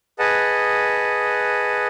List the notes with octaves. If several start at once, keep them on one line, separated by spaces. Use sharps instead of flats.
G#4 B4 D#5 F#5 A5